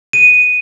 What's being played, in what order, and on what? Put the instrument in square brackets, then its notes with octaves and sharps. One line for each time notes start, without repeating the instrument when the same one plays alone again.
[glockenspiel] D#7